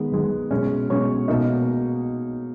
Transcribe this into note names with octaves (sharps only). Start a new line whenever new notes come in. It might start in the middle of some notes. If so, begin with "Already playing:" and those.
Already playing: D#3 G#3 B3 B4
D#3 G#3 B3
B2 G#3 C#4
B2 G#3 C#4 C#5 C#6
B2 A#3 D#4